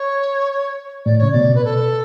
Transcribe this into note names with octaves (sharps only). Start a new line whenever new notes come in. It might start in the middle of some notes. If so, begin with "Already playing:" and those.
Already playing: C#5
A2 D5
C#3 C#5
B2 D5
B4
A4